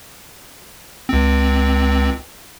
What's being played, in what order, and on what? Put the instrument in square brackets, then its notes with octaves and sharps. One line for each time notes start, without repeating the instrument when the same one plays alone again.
[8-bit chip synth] C#2 C4